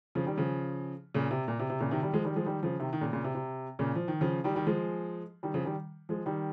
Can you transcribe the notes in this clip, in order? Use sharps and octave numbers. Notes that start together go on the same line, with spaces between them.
C#3 F3
D#3 G3
C#3 F3
A#2 C#3
C3
A#2
C3
C3
A#2 C#3
C3 D#3
D#3 G3
F3 G#3
D#3 G3
F3 G#3
D#3 G3
C#3 F3
C3 D#3
D#3
A#2 C#3
A#2 C#3
C3
C3
A#2 C#3
F3
D#3
C#3 F3
D#3 G3
D#3 G3
F3 G#3
D#3 G3
C#3 F3
D#3 G3
F3 G#3
D#3 G3